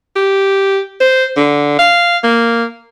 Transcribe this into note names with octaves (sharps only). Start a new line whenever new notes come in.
G4
C5
D3
F5
A#3